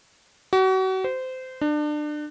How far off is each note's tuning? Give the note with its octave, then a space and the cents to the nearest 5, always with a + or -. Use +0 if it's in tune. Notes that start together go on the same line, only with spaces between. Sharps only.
F#4 +35
C5 -20
D4 +30